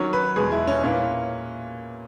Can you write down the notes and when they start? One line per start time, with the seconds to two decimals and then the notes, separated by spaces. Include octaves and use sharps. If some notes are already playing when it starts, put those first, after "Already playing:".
Already playing: D#3 F#3 C#4 C#5
0.13 B4
0.36 E2 B2 G#3 G#4
0.52 E4
0.67 C#4
0.83 A#2 A#3 C#4 E4 B4